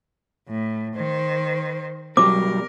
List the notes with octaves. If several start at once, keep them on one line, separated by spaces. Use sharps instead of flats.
A2
D#3 C5
B2 F#3 G3 A#4 D6